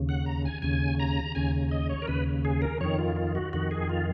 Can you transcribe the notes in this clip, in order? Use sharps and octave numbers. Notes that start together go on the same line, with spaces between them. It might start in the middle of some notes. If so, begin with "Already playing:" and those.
Already playing: D#2 C#3
F#5
A#5
G#5
D#2 C#3 G#5
A#5
D#2 C#3 G#5
D#5
C#5
A#4
D#2 C#3 B4
G#4
A#4
F2 D#3 C#5
F4
F4
F#4
F2 D#3 F#4
G#4
F4